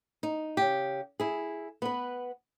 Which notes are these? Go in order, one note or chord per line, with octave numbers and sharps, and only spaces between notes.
D#4
C#3 G4
E4 G#4
B3 B4